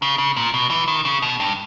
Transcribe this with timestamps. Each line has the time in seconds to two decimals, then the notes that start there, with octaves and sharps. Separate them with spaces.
0.02 C#3
0.18 C#3
0.37 A#2
0.54 B2
0.70 E3
0.88 D#3
1.05 C#3
1.22 B2
1.40 G2